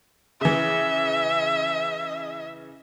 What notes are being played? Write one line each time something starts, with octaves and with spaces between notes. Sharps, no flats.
C#3 E3 E5